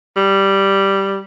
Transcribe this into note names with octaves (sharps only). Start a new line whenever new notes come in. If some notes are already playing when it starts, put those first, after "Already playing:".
G3